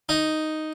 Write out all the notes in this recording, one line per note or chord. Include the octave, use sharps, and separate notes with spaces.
D#4